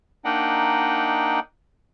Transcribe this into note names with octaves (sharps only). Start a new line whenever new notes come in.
A#3 D4 D#4 D#5 F#5 G5